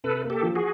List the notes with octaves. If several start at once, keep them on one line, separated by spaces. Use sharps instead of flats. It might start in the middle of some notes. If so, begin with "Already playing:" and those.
C3 A4 B4
A#3
G4 A4
F3
F#4 G#4